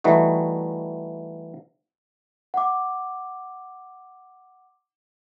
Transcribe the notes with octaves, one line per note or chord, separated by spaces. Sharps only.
E3 G3 A3 D#4 F#4
F#5 D6